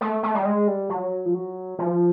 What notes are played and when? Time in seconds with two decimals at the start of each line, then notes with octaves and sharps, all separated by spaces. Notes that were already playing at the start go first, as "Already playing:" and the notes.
0.01 A3
0.23 A3
0.35 G3
0.45 G#3
0.68 G3
0.89 F#3
1.26 F3
1.34 F#3
1.79 F3